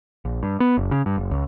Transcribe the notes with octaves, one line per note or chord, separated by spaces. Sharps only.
A#1
G2
B3
F#1
C#3
G2
F#1
C#2